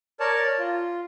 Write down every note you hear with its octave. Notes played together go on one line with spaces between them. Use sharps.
A#4 C#5 D5 A5
F4